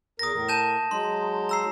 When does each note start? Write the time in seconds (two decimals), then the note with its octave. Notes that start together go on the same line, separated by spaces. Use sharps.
0.19 E2 A#4 D#6 A#6
0.33 A2 A#4
0.49 A5 G6 E7
0.91 F#3 G#3 D#4 C6
1.49 A#5 E6 C7